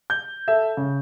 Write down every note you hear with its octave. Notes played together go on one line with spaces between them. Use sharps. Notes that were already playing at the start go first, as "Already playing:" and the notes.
G6
A4 E5
C#3